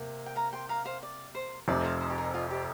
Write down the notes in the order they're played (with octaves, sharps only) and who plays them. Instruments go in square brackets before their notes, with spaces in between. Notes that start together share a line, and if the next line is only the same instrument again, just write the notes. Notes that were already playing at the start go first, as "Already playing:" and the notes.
Already playing: [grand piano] C3 A#3
[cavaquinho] G5
F5 A#5
G5 C6
F5 A#5
C5 F5
D5
C5
[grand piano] F1 F2 C3 [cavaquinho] D5
[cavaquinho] C5 F5
C5
G4
A#4
F4
G4